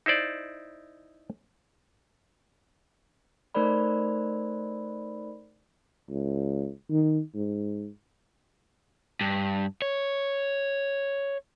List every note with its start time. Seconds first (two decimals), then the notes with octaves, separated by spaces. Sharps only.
0.06 D#4 E4 C5 D5
3.54 A3 D#4 A#4 C5 D5 B5
6.09 C#2
6.90 D#3
7.35 G#2
9.21 G2
9.82 C#5